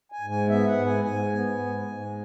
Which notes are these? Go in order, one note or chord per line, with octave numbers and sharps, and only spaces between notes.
G#5
G#2
G#5
B3 E5
F#5
G#2
G#5
G#2 G#5
B3
G#2
G#2